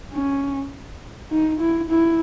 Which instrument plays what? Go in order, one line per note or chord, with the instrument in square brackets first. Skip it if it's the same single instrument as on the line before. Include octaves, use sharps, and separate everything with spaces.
[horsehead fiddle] C#4
D#4
E4
E4